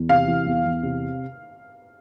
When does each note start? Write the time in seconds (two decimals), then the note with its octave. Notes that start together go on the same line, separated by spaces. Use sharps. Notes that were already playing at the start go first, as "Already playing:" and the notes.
Already playing: E2
0.09 C3 F5
0.28 E3
0.46 E2
0.65 E2
0.83 C3